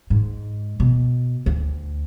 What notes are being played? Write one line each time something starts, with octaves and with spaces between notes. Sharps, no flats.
G#2
B2
D2